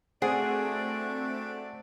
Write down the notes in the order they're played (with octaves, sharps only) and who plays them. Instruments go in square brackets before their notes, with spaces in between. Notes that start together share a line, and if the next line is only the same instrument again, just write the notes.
[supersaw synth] A3 C4 [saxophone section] D4 F#4 D5 [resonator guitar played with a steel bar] G#4 [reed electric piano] C5 F#5